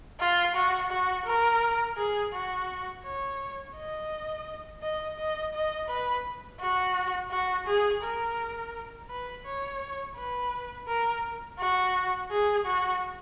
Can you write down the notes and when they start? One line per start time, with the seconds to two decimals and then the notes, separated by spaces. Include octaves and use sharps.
0.20 F4
0.55 F#4
0.91 F#4
1.26 A#4
1.97 G#4
2.33 F#4
3.05 C#5
3.76 D#5
4.82 D#5
5.19 D#5
5.54 D#5
5.89 B4
6.60 F#4
7.31 F#4
7.67 G#4
8.03 A#4
9.09 B4
9.45 C#5
10.17 B4
10.88 A#4
11.59 F#4
12.31 G#4
12.66 F#4